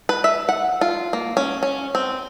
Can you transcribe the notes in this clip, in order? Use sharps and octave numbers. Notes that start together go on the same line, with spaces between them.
B4
E5
F#5
F4
A#3
C#4
C#4
C4